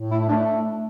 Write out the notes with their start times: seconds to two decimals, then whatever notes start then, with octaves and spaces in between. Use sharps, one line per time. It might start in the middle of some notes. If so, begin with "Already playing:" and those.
Already playing: A2
0.10 A3 E4
0.28 A3 D4